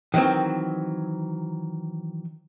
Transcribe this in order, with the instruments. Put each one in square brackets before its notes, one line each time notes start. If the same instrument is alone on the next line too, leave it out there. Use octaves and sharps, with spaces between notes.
[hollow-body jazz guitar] D#3 E3 F#3 C4